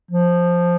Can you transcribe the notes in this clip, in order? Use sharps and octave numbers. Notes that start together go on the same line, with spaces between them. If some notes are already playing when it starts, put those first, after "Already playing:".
F3